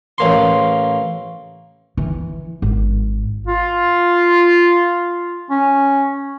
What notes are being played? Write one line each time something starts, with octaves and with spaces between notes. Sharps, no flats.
A1 A#3 C6
E3
G#1
F4
C#4